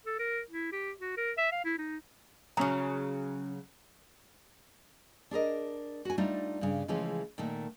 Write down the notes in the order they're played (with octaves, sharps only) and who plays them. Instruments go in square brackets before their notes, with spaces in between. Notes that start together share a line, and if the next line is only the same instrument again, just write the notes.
[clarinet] A4
A#4
E4
G4
F#4
A#4
E5
F5
E4
D#4
[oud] C#3 F#3 [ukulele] C#4 A#5
[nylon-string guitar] D4 G#4 A#4 D#5
F#4 G#5
G3 A3 D4 D#4 F4
G2 C#3
C#3 E3 F3 G#3 A3 C#4
A#2 D#3 A3 A#3